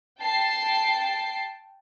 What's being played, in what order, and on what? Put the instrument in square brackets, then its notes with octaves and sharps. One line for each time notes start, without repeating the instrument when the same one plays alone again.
[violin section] G5 A5 C7